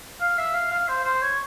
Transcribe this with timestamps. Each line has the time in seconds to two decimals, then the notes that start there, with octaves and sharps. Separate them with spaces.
0.21 F5
0.38 E5
0.54 F5
0.71 F5
0.89 C5
1.05 C5
1.22 C#5